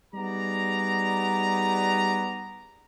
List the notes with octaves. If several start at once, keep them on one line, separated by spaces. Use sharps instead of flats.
G3 B3 D#4 G#4 D5 A#5